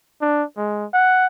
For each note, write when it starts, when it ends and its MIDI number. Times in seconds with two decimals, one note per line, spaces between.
0.21 0.44 62
0.57 0.85 56
0.93 1.27 78